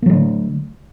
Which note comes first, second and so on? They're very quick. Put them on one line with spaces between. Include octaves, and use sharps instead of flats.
A#3 F#3 A3 D3